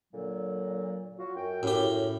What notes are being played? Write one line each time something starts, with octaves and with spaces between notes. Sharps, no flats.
A#2 D3 F#3
F#3 F4 F#4
F#2 G5
F#2 A2 G4